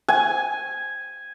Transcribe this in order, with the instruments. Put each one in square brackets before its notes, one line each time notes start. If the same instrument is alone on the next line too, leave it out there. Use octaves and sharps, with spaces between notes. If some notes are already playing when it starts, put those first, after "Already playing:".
[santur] G#5